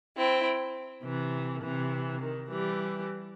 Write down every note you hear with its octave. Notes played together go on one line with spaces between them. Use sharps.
C4 E4
C3 E3
C3 E3
D#3
E3 G3